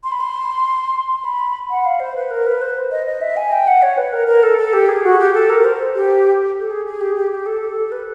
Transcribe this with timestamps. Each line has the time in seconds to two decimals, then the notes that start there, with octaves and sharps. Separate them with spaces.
0.04 C6
0.12 B5
0.20 C6
1.09 C6
1.25 B5
1.70 F#5
1.85 F5
2.00 C5
2.16 B4
2.31 A#4
2.46 B4
2.61 C5
2.91 D#5
3.06 D#5
3.21 E5
3.37 G#5
3.52 G5
3.67 F#5
3.82 C#5
3.97 B4
4.13 A#4
4.27 A#4
4.43 A4
4.58 A4
4.73 G4
4.89 G#4
5.04 F#4
5.19 G4
5.34 A4
5.49 A#4
5.65 C5
5.95 G4
6.60 A4
6.71 G#4
6.86 G#4
7.01 G4
7.15 G4
7.31 G4
7.46 A4
7.61 A4
7.92 B4